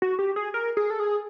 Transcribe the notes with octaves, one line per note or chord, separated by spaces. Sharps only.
F#4
G4
G#4
A#4
G#4
A4
G#4